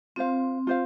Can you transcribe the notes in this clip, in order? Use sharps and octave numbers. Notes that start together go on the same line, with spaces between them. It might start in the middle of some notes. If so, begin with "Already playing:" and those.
C4 F4 C5 F5
F4 C5 F5